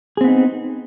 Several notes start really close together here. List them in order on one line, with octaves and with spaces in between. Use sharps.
G#4 C4 B3 D#4